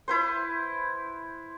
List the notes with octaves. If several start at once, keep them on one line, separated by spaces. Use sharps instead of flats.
E4 B4 C5